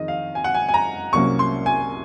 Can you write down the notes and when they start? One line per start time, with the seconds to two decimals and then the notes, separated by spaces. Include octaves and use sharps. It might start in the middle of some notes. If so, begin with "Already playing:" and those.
Already playing: F2 D#3 G#3 C4 D#5
0.08 F5
0.35 G#5
0.44 F#5
0.55 G#5
0.69 G#5
0.74 A#5
1.13 C2 C3 F#3 A#3 C#4 C#6
1.39 C6
1.66 G#5